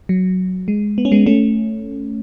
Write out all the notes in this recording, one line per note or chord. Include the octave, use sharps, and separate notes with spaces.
F#3
G#3
B3
C#4
G#3 B3
A3 C#4